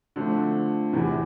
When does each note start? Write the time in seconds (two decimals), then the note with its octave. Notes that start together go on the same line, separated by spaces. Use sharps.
0.16 D3 F3 A3 C4
0.93 E2 C3 E3